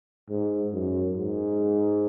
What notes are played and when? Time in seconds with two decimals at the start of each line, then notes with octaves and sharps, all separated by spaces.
0.30 G#2
0.74 F#2
1.17 G#2